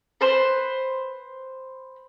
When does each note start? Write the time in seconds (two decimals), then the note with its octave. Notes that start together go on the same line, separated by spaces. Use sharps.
0.21 B4 C5